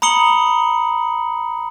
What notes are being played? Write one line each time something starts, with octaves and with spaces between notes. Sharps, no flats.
A#5 B5 D#6 C#7 F#7 G7